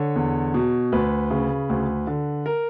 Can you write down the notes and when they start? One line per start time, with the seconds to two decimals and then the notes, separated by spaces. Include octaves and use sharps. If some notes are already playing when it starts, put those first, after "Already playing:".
Already playing: D3 C#5
0.16 E2
0.54 B2
0.92 D2 B4
1.31 C#3
1.70 D2
2.07 D3
2.46 A#4